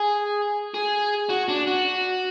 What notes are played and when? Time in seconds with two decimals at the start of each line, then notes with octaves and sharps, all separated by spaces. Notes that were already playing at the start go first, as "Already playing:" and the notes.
Already playing: G#4
0.74 G#4
1.29 F#4
1.49 D4
1.67 F#4